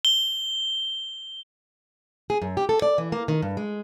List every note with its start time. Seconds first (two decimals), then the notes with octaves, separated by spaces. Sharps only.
0.05 G7
2.30 G#4
2.42 F#2
2.57 G4
2.69 A4
2.82 D5
2.98 E3
3.12 A#3
3.28 D#3
3.42 G2
3.57 G#3